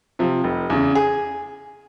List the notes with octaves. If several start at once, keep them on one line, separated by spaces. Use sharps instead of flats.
C3 F3
F1
E2 C#3
G#4